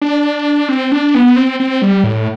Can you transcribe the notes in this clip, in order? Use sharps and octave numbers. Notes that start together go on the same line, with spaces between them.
D4
C4
D4
B3
C4
C4
G3
A2